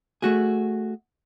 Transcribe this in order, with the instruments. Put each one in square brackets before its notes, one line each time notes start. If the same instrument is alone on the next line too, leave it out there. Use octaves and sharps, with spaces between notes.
[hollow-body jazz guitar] A3 F#4 G#4